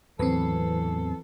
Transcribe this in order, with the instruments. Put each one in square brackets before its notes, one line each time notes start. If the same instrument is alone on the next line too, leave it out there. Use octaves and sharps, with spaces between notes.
[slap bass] E2 A2 F#3 [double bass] E3 [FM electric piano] C4 B4 [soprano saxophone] A4